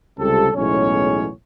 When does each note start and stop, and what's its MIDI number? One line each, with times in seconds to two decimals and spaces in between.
0.19 0.49 37
0.19 0.49 48
0.19 0.49 55
0.19 0.49 60
0.19 0.49 69
0.55 1.29 35
0.55 1.29 40
0.55 1.29 45
0.55 1.29 56
0.55 1.29 61
0.55 1.29 73